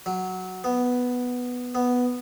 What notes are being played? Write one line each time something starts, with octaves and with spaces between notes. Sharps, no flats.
F#3
B3
B3